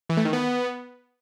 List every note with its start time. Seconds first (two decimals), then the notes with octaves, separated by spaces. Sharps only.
0.10 E3
0.17 A3
0.25 D#3
0.33 B3